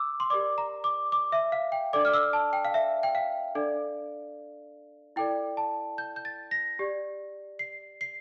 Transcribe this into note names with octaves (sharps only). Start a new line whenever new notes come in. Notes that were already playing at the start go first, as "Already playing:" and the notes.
Already playing: D6 E6
C6
G4 A#4 D5 D6
A#5
D6
D6
E5
F5
G5
D4 A4 D5 D6
F6
E6
A5
G5
F5
E5
G5
F5
D4 A4 D5
E4 A4 D5 G5
A5
G6
G6
A6
A#6
G4 D5
C7
C7